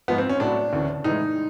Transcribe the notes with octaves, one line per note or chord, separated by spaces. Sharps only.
G#2 F3 G#3 B3
C4
C#4
A2 F#3 D4
D2 C#3 E3
A2 E3 G#3 D#4